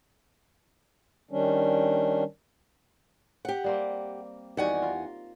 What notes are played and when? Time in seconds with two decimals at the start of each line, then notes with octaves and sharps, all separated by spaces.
1.31 D#3 G3 C#4 D4
3.45 G4 F#5
3.64 G3 A#3 C4
4.57 E2 D#3 G3 F#4 F#5 G#5
4.82 F4 A#4